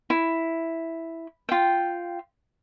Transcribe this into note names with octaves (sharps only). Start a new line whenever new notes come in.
E4
F4 G5